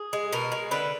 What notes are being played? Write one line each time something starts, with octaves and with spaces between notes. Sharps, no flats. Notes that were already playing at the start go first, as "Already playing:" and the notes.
Already playing: G#4
G#3
B2 A#4
G#3
D3 B4